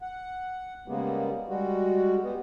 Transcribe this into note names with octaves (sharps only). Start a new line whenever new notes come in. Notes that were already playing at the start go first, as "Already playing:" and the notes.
F#5
C#3 G3 G#3 A#3 B3
G3 G#3 F#4
G3 B3